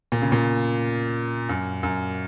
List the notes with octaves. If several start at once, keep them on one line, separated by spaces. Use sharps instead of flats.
A#2
C#3
A#2
F#2
F#2